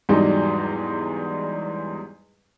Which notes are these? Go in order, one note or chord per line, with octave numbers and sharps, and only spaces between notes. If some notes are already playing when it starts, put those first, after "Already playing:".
E2 G#2 F#3 G3 D4 D#4